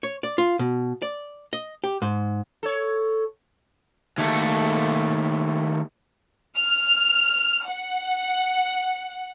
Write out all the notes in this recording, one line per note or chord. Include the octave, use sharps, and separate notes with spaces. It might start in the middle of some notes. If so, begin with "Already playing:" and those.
C#5
D5
F4
B2
D5
D#5
G4
G#2
A4 C#5
D#2 A3
F6
F#5